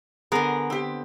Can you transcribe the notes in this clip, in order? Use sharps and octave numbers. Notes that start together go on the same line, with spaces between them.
D3 B3 G#4 A#4
C4 G4